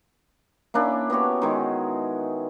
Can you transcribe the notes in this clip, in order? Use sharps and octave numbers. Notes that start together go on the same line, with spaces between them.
A#3 C#4 D4 E4
B3 F#4 G4 C#5
D#3 G#3 E4